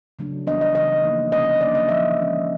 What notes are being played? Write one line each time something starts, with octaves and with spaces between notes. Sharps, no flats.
C#3 F#3 A3 D4
E3 G3 B3 D4 D#5
D#5
C#3 E3 A3 D4 D#5
F3 A#3 D#4
C3 E3 G#3 C#4 D#5
D3 F#3 A#3 D4 D5
D#5
C#3 F3 A3 E5
E3 G#3 C#4